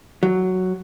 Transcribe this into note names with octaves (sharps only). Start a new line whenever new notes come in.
F#3